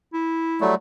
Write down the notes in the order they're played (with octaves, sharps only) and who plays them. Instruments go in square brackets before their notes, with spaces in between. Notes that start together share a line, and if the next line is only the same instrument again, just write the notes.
[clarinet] E4
[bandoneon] F#3 G3 A3